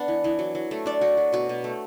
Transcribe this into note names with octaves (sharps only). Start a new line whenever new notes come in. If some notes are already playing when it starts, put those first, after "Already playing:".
Already playing: B3 D4 F#5
E3
E3
F#3
F#3
A3
D4 D5
F#3 F#4
F#3
B2 F#4
B2
A3